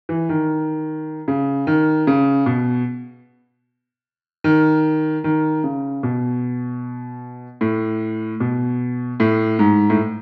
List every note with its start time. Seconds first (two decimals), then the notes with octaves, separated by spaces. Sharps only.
0.09 E3
0.29 D#3
1.28 C#3
1.67 D#3
2.07 C#3
2.46 B2
4.44 D#3
5.24 D#3
5.64 C#3
6.03 B2
7.61 A2
8.40 B2
9.20 A2
9.59 G#2
9.90 A2